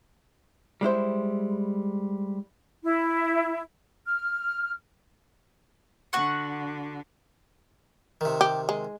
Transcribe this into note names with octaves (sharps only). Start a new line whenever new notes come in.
G3 G#3 E4 C5
E4
F6
D3 F#4 F#5 C#6
C3 D#3
G4
G#3